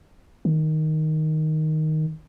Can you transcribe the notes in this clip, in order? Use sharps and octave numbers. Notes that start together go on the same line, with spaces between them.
D#3